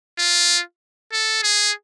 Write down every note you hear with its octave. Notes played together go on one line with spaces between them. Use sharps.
F4
A4
G#4